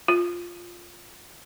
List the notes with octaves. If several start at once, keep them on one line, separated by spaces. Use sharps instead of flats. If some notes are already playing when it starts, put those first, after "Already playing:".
F4